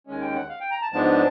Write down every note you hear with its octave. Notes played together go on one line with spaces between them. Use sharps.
D#2 D#3 G#3 C#4 G#5
G5
F#5
F5
G5
A#5
A5
G#2 F3 G#3 B3 D4 A5